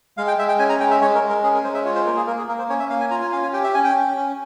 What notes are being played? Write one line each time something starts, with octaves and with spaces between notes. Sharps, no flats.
G#3 F5
G5
G#3 E5
G5
C#4 G#5
A#5
G#3 G5
E5
G#3 C#5
A#4
G#3
A#4
C#4 G#4
A#4
G#3 C5
E5
F4 C#5
C5
A#3 A#4
G#4
A#3 A#4
G#4
A#3 A#4
C5
C#4 C#5
E5
A#3 F5
G#5
F4 A#5
G#5
C#4 F5
G#5
G4 G5
E5
C#4 G#5
G5
C#4
C#4